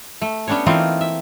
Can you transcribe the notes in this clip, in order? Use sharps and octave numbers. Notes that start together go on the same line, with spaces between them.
A3
B3 C#4 D4 G4 C#5
E3 A3 A#3 C4 D#4 F4
E5